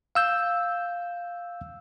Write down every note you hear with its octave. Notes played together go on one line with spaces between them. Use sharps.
F5 E6 G6